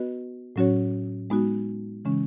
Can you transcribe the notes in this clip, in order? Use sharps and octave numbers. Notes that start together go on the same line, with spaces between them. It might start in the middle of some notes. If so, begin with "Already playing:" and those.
Already playing: B3 F#4 B4 D#5
A2 F#3 C#4 F#4 C#5
G#3 B3 D#4 F#4
C#3 E3 G#3 C#4